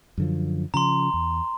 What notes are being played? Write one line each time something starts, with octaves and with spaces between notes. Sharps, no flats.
F#2 D3 F3
C#3 F3 A#5 C6
E2